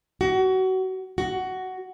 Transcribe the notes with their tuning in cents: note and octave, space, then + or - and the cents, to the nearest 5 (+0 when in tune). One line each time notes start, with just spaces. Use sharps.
F#4 +25
F#4 +10